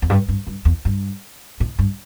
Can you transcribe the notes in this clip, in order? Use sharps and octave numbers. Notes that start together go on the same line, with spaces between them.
E2
G2
G2
G2
E2
G2
A2
G2